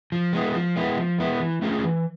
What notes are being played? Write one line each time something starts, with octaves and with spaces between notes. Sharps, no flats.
F3
G#3 B3 E4
F3
G#3 B3 E4
F3
G#3 B3 E4
E3
A3 C#4 F4 G#4
E3